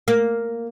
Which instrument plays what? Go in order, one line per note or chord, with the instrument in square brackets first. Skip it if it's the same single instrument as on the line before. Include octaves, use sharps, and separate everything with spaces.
[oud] A#3